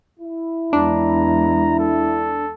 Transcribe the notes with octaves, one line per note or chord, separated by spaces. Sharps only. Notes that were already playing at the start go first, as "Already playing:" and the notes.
E4
E2 G#3 D4 A#5
A4